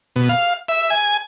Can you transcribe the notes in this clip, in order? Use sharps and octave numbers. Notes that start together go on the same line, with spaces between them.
B2
F5
E5
G#5